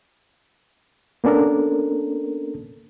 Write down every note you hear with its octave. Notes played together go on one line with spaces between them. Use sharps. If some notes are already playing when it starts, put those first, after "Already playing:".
A#3 B3 C#4 D4 A4 A#4